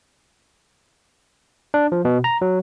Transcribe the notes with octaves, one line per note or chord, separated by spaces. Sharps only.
D4
F3
B2
A#5
F#3